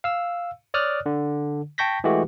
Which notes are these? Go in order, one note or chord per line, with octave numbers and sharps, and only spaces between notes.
F5 E6
C#5 D5 D#6 F6 F#6
D3
G5 A5 C#6 G6 A#6 B6
E3 G#3 A3 F#4 G4